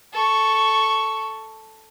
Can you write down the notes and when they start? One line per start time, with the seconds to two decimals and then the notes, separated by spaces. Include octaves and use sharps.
0.13 A4 C#6